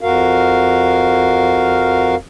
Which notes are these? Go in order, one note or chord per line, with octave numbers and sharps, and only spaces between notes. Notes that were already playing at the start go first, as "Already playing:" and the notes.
F2 F#4 A#4 F5